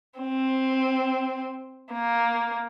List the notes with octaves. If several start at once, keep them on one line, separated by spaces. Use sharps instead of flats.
C4
A#3